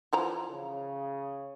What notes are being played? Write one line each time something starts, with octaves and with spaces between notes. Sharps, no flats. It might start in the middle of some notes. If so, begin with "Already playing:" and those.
E3 F3 A#5
C#3